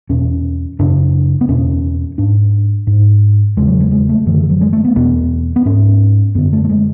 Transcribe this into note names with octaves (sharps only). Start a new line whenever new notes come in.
E2 B2 C#4
F#2 C#3 D4
B3
E2 B2 C#4
G#2 D4
G#2
E2 C#3 G#3
F#3
G#3
G#3
A3
F#2 D3 E3
E3
F#3
G#3
A3
B3
E2 B2 B3
B3
G#2 C#4
F#2 D3 B3
A3
A3
G#3